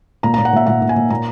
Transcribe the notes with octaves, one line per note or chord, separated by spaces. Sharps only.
A#2 A#5
A#5
A#2
F#5
A#2 E5
A#2 F#5
A#2
G#5
A#2
A#2 A#5